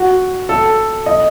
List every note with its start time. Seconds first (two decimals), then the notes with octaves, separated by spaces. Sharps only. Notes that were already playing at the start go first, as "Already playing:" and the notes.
Already playing: F#4
0.49 A4
1.06 D#5